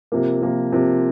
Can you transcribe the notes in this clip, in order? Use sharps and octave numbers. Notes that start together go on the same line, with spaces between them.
C3 F3 A#3
C3 F3 A#3
C3 F3 A#3